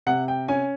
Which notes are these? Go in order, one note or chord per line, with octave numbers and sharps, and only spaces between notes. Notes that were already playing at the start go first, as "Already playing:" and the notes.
C3 F#5
G5
C#4 G#5